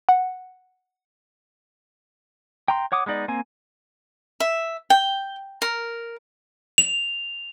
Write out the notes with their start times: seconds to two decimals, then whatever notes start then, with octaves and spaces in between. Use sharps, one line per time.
0.09 F#5
2.68 G5 A#5 C6
2.92 C#5 F#5 D6 D#6
3.06 G#3 B3 D#4 D5
3.28 A#3 C4 G#5
4.40 E5
4.90 G5
5.62 A#4
6.78 F7